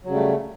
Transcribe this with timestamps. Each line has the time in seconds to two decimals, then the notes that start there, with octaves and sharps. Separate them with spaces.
0.04 F#3
0.07 C#3
0.11 G3
0.15 A3